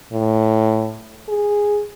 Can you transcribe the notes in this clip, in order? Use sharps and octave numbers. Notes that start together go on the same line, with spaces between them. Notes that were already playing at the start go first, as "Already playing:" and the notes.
A2
G#4